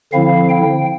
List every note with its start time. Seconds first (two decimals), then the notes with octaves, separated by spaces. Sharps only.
0.13 D3 F3 C4 E4 F5
0.49 G5